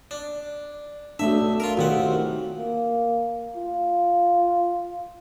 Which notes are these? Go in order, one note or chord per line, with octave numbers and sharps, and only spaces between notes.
D4
B1 A3 D4 E5
F4 A#4
B1 C3 D#3 F4 F#5
A#3
F4